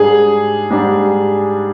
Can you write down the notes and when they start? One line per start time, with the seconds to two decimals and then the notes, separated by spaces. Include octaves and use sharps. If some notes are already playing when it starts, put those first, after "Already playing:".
Already playing: G#2 G3 D4 G#4
0.70 G#2 G3 D4